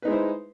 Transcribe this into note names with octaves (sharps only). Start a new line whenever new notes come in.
G#3 D#4 E4 B4 C5